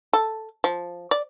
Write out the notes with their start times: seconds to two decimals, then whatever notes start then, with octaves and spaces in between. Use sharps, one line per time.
0.13 A4
0.64 F3
1.11 D5